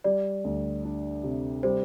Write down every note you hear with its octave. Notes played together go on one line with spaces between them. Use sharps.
G3 D5
D2
D4
C3
G3 C5